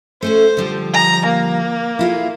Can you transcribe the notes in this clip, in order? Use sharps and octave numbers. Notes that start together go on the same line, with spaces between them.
A3 C#4 F#4 C5
D3 F3 G3
A#5
A#3
E4 F4 G#4